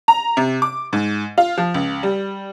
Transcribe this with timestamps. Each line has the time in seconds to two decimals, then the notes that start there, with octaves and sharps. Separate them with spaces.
0.08 A#5
0.37 C3
0.62 D6
0.93 G#2
1.38 F4
1.58 F3
1.74 C#2
2.03 G3